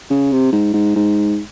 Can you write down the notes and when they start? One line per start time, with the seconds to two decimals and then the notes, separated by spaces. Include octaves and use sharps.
0.10 C#3
0.32 C3
0.52 G#2
0.73 G#2
0.96 G#2